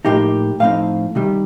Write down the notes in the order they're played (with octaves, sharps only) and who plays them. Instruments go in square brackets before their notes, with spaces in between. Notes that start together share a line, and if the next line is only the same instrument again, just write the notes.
[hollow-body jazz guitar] A2 F3 A#3 D#4 G4
A2 F3 C4 D#4 F5
C3 D#3 G3